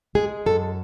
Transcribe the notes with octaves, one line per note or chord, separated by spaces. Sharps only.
G#3 G#4
F#2 A4